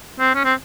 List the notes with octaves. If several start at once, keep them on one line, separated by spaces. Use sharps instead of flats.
C4
C#4
C4